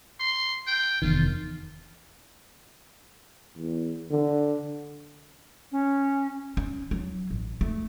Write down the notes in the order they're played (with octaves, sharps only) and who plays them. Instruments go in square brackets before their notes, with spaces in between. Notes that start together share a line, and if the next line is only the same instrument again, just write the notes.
[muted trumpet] C6
G5
[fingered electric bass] F1 E2 D#3 [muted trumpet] F4
[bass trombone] E2
D3
[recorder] C#4
[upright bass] C#4
F#3
A1
A3